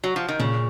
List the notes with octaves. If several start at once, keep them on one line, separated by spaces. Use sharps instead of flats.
F#3
F3
D#3
A#2 C#3